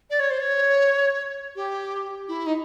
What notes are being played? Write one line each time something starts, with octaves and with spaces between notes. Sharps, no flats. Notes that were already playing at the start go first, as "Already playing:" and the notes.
D5
C#5
C5
C#5
G4
E4
D#4